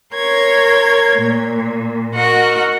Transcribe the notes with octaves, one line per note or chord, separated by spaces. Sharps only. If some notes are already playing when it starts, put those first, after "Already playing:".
A#4 C#5 C6 G#6
A#2
F#4 A#4 D#5 F#5